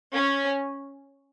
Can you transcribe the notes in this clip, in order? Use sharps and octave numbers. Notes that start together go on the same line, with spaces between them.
C#4